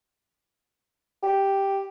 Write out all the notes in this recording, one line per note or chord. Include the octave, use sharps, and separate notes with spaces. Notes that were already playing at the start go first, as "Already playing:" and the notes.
G4